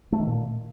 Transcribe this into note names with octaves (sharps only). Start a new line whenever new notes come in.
A3
D#3
A#2